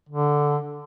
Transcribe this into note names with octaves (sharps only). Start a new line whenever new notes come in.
D3